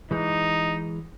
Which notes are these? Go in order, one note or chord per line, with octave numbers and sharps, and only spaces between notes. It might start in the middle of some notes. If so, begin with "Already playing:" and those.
E3 G#3 D#4